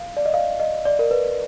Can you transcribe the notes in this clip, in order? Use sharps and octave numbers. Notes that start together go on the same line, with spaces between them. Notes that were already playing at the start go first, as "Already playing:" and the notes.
Already playing: F5
D5
D#5
F5
D#5
D5
A#4
B4